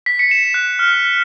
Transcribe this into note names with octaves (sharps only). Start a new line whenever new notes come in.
B6
C#7
E7
F#6
F6